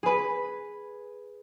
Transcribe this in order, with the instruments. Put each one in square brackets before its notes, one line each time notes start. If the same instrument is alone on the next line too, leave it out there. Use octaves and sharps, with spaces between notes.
[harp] G#4 B4